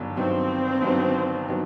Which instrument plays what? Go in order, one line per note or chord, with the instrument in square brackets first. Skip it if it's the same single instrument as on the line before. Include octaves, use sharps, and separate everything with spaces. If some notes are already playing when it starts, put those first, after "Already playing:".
Already playing: [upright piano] G1 G2 D#3 F#3 B3
[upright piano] G1 G2 D#3 F#3 B3 [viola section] C4
[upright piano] G1 G2 D#3 F#3 B3
D#3 F#3 B3